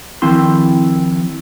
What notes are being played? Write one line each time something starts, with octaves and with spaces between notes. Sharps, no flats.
D#3 F3 C4 E4 C6